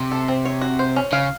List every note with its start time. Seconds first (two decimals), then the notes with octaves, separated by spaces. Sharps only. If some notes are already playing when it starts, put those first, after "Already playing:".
Already playing: C3
0.12 A4
0.28 C4
0.45 C#5
0.61 F#4
0.79 C5
0.96 C#4
1.13 C#3 F5